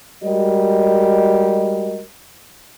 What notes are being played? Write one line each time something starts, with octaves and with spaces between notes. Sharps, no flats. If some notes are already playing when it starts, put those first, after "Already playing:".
G3 G#3 F#4 A#4 D#5